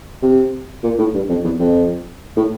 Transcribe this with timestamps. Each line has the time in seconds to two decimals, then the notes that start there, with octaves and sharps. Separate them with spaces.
0.22 C3
0.83 A#2
0.98 A2
1.14 G2
1.29 F2
1.44 E2
1.59 F2
2.36 A2